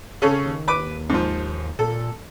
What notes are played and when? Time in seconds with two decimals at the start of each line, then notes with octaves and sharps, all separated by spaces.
0.22 C#3 C#4 A4
0.45 D#2
0.68 B4 D6
1.10 G#2 F3
1.79 A#2 A4